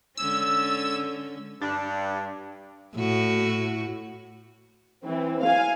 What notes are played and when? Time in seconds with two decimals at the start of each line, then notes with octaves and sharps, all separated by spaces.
0.17 D3 G#3 C#4 E6
1.61 G2 D4
2.95 A2 F#4
5.03 E3 C4
5.43 F5 G#5